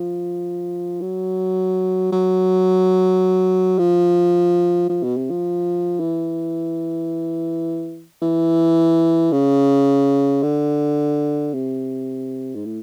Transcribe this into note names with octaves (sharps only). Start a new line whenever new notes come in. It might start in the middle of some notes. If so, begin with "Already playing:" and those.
Already playing: F3
F#3
F#3
F3
F3
B2
C3
F3
E3
E3
C#3
D3
C3
G#2
A2